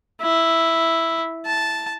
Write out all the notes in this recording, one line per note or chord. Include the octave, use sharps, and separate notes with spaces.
E4
A5